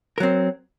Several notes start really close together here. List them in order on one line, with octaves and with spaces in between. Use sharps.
A#4 F#3 C4